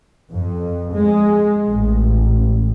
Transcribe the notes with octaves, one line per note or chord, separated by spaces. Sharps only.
F2
G#3
A1